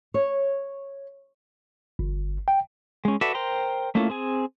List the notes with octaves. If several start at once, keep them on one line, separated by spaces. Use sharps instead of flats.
C#5
G1
G5
G#3 C#4
F#4 A4 B4 D5 E5
A#4 C5 G5 A#5 C6
A3 A#3 C#4 E4 F4
C4 G#4 G#5